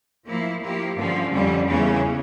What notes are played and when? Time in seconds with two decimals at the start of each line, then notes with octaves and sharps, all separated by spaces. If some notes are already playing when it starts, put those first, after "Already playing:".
0.25 F3 A#3 E4
0.61 F3 A#3 E4 G4
0.96 G2 D3 F3 C#4 F4
1.31 F2 D3 G3 C#4
1.67 E2 C#3 E3 A#3 C#4